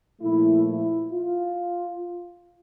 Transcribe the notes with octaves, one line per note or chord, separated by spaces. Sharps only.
A#2 F3 A3 E4
E4
F4